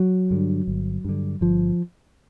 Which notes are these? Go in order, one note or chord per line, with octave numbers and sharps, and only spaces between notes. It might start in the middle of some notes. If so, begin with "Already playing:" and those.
Already playing: F#3
G2 D3
G1
G2 D3
G1 F3